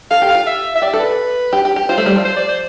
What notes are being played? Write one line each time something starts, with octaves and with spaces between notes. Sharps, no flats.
A4 F5
G4
F5
F4
E5
E5
G4 D5
A4
B4
G4
G4
G4
F4 C5
A3
G3
F3
C5
D5
C5